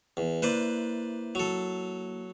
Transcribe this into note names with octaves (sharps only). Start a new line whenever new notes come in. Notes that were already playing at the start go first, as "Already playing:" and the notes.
E2
A#3 E4 B4 C5 D5
F#3 A4